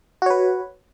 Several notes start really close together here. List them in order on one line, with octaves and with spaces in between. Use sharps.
F#4 C#5 B4